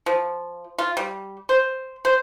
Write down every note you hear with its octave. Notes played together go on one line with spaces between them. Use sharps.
F3
F4
G3
C5
C5